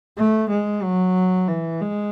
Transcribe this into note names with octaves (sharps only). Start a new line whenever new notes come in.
A3
G#3
F#3
E3
G#3